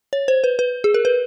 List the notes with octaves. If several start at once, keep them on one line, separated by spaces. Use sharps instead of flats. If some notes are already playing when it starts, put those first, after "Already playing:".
C#5
C5
B4
B4
G#4
A#4
B4